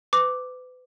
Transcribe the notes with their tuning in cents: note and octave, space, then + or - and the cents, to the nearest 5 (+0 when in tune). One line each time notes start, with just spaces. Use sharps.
B4 +35 D6 +0